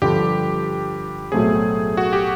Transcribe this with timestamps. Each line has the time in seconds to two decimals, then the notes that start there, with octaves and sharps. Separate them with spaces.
0.02 G2 D3 F3 G4
1.32 B1 A2 F#3 A3 C4 G#4
1.97 F#4
2.13 G4